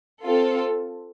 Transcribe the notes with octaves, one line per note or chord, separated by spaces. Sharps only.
C4 F4 A4